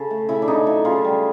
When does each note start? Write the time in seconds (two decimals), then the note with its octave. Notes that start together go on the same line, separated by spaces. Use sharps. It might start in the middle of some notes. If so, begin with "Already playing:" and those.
Already playing: C#3 A4
0.10 A3
0.29 C#3 E4
0.42 D4
0.48 C#3 D#4
0.66 F#3 E4
0.85 C#3 F4
1.04 G3